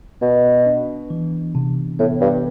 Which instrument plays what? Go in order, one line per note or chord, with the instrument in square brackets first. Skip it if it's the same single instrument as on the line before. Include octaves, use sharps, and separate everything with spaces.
[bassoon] B2 [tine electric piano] B3
[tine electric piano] D4
E3
C3
[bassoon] A2 [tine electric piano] B3
[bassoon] G2